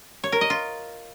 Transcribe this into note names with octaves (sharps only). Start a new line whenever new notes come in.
C#5
A#4
D#5
F4